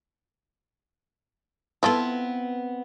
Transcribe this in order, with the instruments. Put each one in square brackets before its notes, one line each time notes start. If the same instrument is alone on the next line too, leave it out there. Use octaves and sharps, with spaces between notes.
[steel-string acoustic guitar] B3 C4 [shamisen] E4 F4 A4